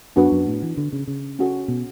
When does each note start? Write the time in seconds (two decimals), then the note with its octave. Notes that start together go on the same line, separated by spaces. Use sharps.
0.16 F#2 B3 D4 F#4 B4
0.32 F#2
0.47 A2
0.62 E3
0.77 D3
0.93 C#3
1.08 C#3
1.39 C#4 F#4 A4
1.68 B2